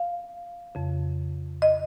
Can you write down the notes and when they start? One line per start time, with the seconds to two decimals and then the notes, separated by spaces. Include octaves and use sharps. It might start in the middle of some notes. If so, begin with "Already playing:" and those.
Already playing: F5
0.75 F2 C#3
1.62 D#5